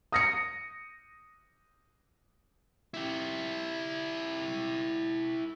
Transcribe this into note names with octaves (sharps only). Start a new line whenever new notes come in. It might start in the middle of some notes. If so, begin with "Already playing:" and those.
D#6 A#6 C#7
E4 G4